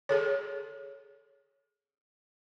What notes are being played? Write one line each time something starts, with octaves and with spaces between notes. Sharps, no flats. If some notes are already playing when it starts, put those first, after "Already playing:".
G#4 A4 C#5